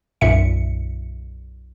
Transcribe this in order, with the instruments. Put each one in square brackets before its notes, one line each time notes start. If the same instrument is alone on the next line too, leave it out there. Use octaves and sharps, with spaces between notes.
[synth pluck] B1 F#2 A#2 E5 C#7